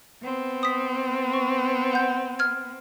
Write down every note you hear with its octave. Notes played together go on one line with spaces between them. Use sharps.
B3 C4
D#6 B6
C#6
F#5 G6
F6 G#6